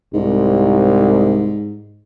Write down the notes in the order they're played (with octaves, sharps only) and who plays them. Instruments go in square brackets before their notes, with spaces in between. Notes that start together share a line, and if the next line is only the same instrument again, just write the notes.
[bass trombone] C2 [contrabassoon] G#2